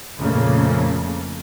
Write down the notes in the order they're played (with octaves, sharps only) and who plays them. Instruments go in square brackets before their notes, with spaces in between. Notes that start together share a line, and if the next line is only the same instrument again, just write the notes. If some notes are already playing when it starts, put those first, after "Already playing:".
[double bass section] F2 A#2 C#3 A3 A#3